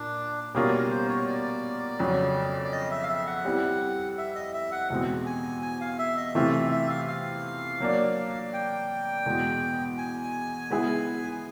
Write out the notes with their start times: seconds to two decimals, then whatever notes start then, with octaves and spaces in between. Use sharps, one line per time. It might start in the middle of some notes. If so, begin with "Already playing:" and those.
Already playing: A#2 D4
0.55 B2 G3 A#3 C#4 F4 G#4
0.72 A#4
0.91 C5
1.09 C#5
1.27 D5
1.99 F2 C#3 F#3
2.64 D5
2.72 D#5
2.91 E5
3.03 F5
3.09 E5
3.26 F#5
3.45 G3 C4 E4
4.18 E5
4.35 D#5
4.54 E5
4.72 F#5
4.90 E2 B2 G#3 C4
5.26 G#5
5.62 G#5
5.81 F5
5.99 E5
6.17 D#5
6.35 C3 E3 A3 C4 F4 E5
6.53 E5
6.72 E5
6.90 F5
7.08 F5
7.80 F#3 A#3 D4
8.53 G5
9.26 E2 B2 G#3
9.98 G#5
10.70 G#3 B3 E4 G#4